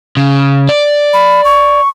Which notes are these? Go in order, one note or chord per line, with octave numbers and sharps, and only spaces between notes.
C#3
D5
B5
C#6